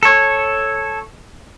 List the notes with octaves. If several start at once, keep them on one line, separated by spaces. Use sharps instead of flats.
A4 C#5